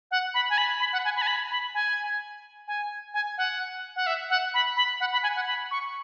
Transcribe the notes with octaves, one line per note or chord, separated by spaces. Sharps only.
F#5
B5
G#5
B5
B5
F#5
G#5
B5
G#5
B5
B5
G#5
G#5
G#5
F#5
F#5
E5
F#5
B5
B5
F#5
B5
G#5
F#5
B5
C#6